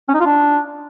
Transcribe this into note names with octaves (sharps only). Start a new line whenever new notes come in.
C#4
D#4
F4
D4